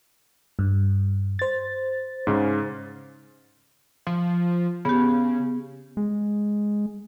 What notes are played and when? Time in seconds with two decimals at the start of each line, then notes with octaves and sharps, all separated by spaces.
0.59 G2
1.39 C5 A6
2.27 G#2 C#3
4.07 F3
4.85 C#3 B3 G4
5.97 G#3